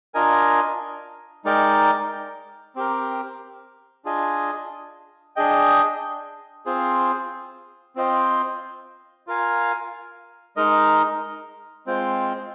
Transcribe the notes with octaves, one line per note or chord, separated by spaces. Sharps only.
D4 F4 A#4 D#5 G#5
G#3 D#4 A#4 D5 G5
C4 G4 A#4
D4 F4 G#4 D#5 G#5
D4 G#4 D#5 G5
C4 F4 G#4 C5
C4 F4 C5 D#5 G5
F4 A#4 F5 G#5
G#3 D#4 A#4 D#5
G#3 C4 F4 C5 G5